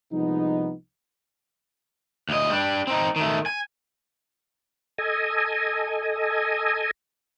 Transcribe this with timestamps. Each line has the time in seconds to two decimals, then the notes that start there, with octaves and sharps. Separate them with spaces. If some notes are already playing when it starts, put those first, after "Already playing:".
0.12 C2 F3 G#3 B3 D#4
2.29 D2 D#5
2.50 G3 D4
2.87 C4 D#4
3.16 D#3 A3
3.46 G#5
4.98 A4 D#5 G#5